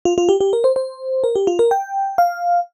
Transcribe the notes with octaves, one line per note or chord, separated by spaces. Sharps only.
F4
F4
G4
G4
A#4
C5
C5
A#4
G4
F4
A#4
G5
F5